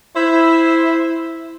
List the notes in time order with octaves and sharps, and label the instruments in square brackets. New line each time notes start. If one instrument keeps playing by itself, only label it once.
[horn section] E4 C5